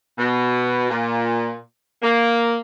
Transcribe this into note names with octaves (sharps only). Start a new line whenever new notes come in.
B2
A#2
A#3